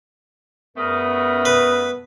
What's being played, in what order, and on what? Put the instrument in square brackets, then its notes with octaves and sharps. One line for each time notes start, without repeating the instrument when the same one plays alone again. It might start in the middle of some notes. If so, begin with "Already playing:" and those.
[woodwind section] F#2 A#4 D#6 [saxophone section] C#3 G3 A3 [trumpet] B3
[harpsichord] B4